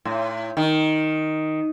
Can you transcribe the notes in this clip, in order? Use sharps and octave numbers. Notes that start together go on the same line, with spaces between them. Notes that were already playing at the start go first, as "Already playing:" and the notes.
A2
D#3